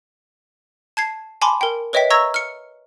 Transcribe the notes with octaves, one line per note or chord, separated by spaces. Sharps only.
A5 G#6 C7
G#5 A5 B5 C6 D6
A#4 G5
B4 C#5 D#5 E5 G5 B6
A#5 C#6 E6 G#6 A#6
F6 C#7